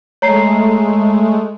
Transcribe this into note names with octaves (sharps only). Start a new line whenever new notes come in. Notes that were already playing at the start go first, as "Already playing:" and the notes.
G#3 A3 C#5 A#5 C7